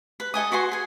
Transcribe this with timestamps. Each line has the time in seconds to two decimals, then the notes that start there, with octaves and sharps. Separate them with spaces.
0.20 B4
0.34 A4 D#5 G#5 D#6
0.52 F#4 B4 G#5 C6
0.72 G#4 G#5